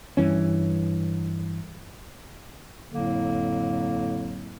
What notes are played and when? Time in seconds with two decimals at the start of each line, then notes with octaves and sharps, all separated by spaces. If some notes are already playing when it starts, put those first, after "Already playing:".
0.17 G2 E3 C#4
2.90 F2 A2 D3 F#3 A#3